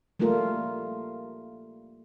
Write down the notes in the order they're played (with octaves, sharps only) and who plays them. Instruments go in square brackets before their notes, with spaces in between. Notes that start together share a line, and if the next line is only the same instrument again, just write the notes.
[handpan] G3 A3 A#3 F4 A#4